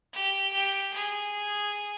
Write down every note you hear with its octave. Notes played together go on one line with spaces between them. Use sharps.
G4
G4
G#4